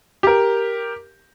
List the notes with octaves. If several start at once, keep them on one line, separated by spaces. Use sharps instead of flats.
G4 A#4